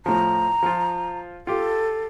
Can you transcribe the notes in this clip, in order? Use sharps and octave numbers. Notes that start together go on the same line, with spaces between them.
A2 F3 A#5
F3 F4
F4 G4 A4